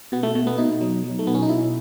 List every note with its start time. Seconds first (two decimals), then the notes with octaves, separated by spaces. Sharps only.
0.12 B2 B3
0.23 A3
0.35 B2 A3
0.47 B3
0.58 B2 D#4
0.81 F#3
1.04 F#3
1.19 A3
1.27 B2 B3
1.35 C#4
1.42 D#4
1.49 B2 E4